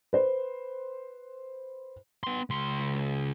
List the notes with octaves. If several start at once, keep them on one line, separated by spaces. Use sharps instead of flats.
B4 C5
B3 C6
C#2 C6